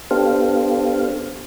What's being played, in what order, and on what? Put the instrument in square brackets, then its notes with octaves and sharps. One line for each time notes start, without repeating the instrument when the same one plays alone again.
[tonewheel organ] B3 D4 G4 A4 C5 F5